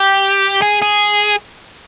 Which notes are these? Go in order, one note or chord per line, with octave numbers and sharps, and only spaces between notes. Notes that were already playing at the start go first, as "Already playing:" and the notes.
Already playing: G4
G#4
G#4